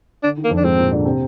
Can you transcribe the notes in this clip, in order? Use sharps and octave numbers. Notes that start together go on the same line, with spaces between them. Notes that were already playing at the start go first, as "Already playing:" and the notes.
D3 D4
D#3
A#3
F2 F3
D4
G#2 G#3 C4
A#2 A#3
D3 D4
C3 C4